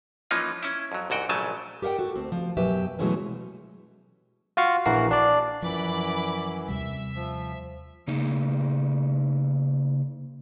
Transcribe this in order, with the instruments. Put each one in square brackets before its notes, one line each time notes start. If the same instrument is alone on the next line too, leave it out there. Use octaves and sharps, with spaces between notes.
[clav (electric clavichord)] E3 F3 A#3 C#4 D#4 F4
C#4 E4
F2 F#3
C2 G#2 F#4 G5
A#1 C#3 F#3 A3 G#5 A5
[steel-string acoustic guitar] G4 A#4 E5 F#5 G5
F#4 A4
D2 C4
F3
F#2 B2 F#3 G4 B4 E5
B2 E3 F#3 G#3 A3 C#4
[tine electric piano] F4 F#4 F5 C#6
A#1 E3 F#4 A#4 C7
D4 D5
[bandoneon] F#2 E3 [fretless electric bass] F3 [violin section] D5 B5 D6
[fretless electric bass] D#2 C3 G3 [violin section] E5
[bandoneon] F3
[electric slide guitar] C#3 A#3 D#4